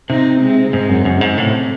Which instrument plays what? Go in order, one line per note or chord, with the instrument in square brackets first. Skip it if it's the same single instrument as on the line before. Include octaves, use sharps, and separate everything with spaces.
[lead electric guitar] C3 [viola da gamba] C4 D#4
[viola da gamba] G#3 C4
[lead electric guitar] G#2 [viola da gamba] G#3 C4
[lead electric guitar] F#2
[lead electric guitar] F#2 [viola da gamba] C#3
[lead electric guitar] G#2
[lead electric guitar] A2 [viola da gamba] C3